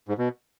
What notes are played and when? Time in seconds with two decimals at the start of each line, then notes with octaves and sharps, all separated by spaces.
0.08 G#2
0.18 B2